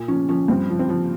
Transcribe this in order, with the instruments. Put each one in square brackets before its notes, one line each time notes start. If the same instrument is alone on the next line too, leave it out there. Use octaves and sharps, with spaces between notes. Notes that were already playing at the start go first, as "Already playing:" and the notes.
Already playing: [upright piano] A#2
F3 C#4
F3 C#4
G2 C4
F3
C4
F3